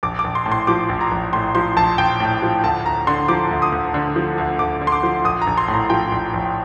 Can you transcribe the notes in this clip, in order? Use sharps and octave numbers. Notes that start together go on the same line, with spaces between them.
A#1 D6
D6
A#1
C6
A2
C6
F3 D6
A#1
A#5
A#1
A2 C6
F3 C6
A#1 A5
A#1 G5
A2
F3
D2 A5
D2 A#5
D3 C6
F3 D6
D2
D#6
D2
D3
F3
D2
D2 D6
D3
C6
D6
F3
A#1 D#6
A#5
A#1
C6
A2
A#5
F3 G5
A#1
A#1